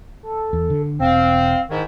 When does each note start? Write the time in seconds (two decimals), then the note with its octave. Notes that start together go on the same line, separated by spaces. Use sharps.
0.23 A4
0.53 E2
0.70 D3
1.00 E1 C4 F5
1.70 G#2 D#3 E4